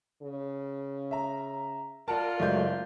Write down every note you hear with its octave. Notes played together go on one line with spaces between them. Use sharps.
C#3
E5 A#5
F4 A#4 D5 F#5 A5
F#1 F#3 G#3 A3 D5 G6